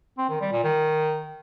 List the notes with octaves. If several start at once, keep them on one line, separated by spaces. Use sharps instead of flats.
C4
D#3
G3
A#2
D#3